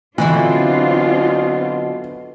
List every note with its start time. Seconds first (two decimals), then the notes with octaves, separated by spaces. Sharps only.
0.18 B2 D3 E3 F#3 C4 D4 E4 F4